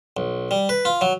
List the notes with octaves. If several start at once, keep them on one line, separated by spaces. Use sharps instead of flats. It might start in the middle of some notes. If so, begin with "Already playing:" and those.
B1
G3
B4
F4
F#3